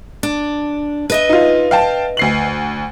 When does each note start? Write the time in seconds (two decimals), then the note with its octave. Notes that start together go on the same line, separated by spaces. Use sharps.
0.23 D4
1.10 B4 D#5 E5
1.29 D#4 F4
1.71 F5 G5 A5
2.17 D2 C7 F#7